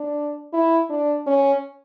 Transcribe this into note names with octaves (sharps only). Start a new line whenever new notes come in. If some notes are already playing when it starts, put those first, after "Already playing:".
Already playing: D4
E4
D4
C#4